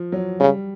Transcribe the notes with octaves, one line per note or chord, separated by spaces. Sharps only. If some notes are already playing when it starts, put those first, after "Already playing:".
Already playing: F3
F#3
C#3 G3